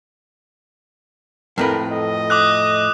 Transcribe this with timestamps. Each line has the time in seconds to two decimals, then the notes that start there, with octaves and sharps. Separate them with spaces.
1.58 F2 A2 A#4 B4
1.91 D#5
2.30 D6 D#6 F#6